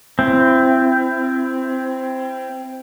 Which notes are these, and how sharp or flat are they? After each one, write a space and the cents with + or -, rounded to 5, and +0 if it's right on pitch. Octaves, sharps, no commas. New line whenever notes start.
C4 +0 E4 +30